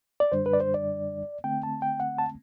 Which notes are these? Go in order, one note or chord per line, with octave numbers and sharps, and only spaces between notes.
D5
F#2 D3 G3 D4 C5
B4
D5
C5
D5
D3 A3 C4 G5
A5
G5
F#5
A5